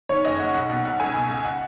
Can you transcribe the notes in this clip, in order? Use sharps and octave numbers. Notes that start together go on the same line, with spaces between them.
D#3 C#5
F#1 D#5
F#1 F#5
B1 F#5
B2 F#5
B1 F#5
C#2 G#5
B2
C#2
F#5